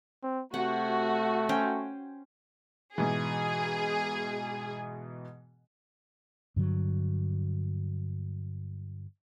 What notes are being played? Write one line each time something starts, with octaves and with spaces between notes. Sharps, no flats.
C4
C3 A3 F#4 F#5
C#4 C5 G5
G#2 B2 E3 G#4
G2 D3 F#3